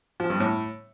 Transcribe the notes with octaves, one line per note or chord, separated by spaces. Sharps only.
F3
G2
A2